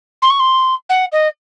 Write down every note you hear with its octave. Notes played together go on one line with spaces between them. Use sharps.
C6
C#6
C6
F#5
D#5